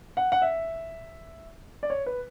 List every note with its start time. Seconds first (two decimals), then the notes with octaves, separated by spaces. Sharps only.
0.17 F#5
0.32 F#5
0.42 E5
1.83 D5
1.90 C#5
2.06 B4